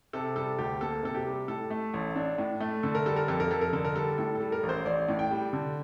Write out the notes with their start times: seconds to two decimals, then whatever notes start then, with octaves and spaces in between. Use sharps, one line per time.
0.13 C3 A4
0.36 G3 A4
0.58 D2 G4
0.81 A#3 A4
1.03 C3 A4
1.15 G4
1.26 G3
1.48 A2 A4
1.71 A3
1.94 A1
2.16 D4
2.38 A2
2.61 A3
2.83 D3 A4
2.95 A#4
3.06 G3 A4
3.16 A#4
3.28 F2 A4
3.40 A#4
3.51 F2 A4
3.61 A#4
3.73 D3 A4
3.85 A#4
3.95 G3 A4
4.18 A2 A4
4.35 A4
4.40 G3
4.52 A#4
4.63 A1
4.69 C5
4.85 A1 D5
5.08 A2
5.19 G5
5.31 G3
5.53 D3